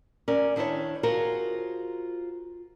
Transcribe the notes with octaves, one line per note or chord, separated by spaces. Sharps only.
C#4 A#4 D5
D#3 D4 E4 C5 C#5
F4 F#4 G#4 A#4 C5 F#5